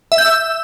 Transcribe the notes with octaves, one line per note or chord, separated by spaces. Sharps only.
E5
G6
E6